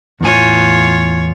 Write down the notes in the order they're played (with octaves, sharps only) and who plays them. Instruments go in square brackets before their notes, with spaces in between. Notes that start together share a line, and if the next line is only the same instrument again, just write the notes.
[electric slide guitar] E2 G#5 [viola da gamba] A2 F4 C#5